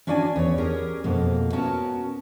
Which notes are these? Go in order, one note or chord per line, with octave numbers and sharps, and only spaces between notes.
C#4 D4 F#4 D5 F5 G#5
E2 C#5
C#4 G4 G#4 A#4
F2 B2 A#3
B3 C#4 F#4 A#4 A5